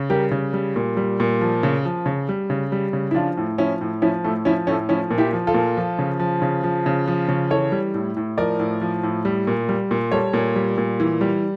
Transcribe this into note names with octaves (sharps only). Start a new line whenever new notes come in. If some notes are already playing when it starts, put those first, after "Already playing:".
Already playing: C#3
G3 G4 A#4
C#3
G3
A#2
G3
A#2
F3
C#3
F3
C#3
G3
C#3
G3
C#3
E4
F3 D4 F4
A2
F3 C#4 E4
A2
F3 C#4 E4
A2 A3
F3 C#4 E4
A2 A3 C#4
F3 C#4 E4
A#2
E4 G4
F3
F4 A4
A#2
F3
C#3
F3
C#3
F3
C#3
F3
C#3
E3 A4 C#5
G3
A2
A2
F3 A#4 D5
A2
F3
A2
G3
A#2
G3
A#2
G3 A4 C#5
A#2
G3
A#2
E3
G3